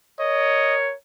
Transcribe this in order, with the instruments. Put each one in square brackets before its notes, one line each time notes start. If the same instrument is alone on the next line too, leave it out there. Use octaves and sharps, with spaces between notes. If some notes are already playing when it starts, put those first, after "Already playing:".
[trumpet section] A#4 C#5 [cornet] D#5